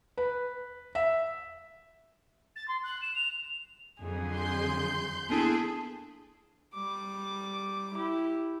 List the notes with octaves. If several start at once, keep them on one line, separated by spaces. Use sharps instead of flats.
B4
E5
A6
C6
F#6
E7
F7
F2 D3 F#3 G#4
C6 G6
A#3 B3 D4 E4 G#4 A4
G3 D6
E4 G4